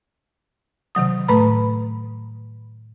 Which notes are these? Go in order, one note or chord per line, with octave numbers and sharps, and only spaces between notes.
C3 D#3 F#3 D#6
A2 A3 B4 A#5 B5